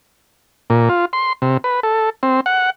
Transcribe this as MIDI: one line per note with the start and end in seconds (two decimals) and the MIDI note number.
0.70 0.89 46
0.89 1.05 65
1.13 1.33 84
1.42 1.57 48
1.64 1.80 71
1.83 2.10 69
2.23 2.40 60
2.46 2.70 78